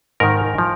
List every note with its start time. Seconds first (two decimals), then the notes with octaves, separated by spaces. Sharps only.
0.20 G#2 D#3 A#4
0.58 F3